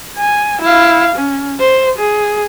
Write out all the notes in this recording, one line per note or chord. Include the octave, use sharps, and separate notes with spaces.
G#5
E4 F5
C#4
C5
G#4